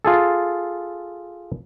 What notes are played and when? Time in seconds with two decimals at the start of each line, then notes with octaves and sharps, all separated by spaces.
0.05 F4 G#4 A4